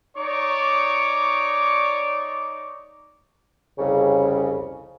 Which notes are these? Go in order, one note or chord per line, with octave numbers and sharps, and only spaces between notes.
D#4 C#5 D5 C#6 D6
C2 F2 C#3